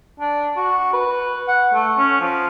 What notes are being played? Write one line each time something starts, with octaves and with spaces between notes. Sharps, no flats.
D4
F#4
B4
F#5
A3
C#4
F3